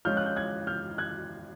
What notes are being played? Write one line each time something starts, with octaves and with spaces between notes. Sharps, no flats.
F3 G#3 C#4 F4 F6 G6
F#6
G6
F#6 G#6
F6 G6
F#6 G#6